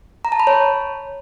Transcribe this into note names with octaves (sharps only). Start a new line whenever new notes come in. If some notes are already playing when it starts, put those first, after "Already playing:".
A#5
A5
B5
C#5